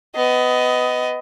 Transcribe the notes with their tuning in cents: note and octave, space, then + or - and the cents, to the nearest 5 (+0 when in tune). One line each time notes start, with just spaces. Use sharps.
B3 +25 D#5 +10